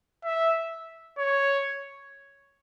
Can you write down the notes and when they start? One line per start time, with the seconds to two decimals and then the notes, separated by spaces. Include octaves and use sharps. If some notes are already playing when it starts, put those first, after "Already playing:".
0.24 E5
1.18 C#5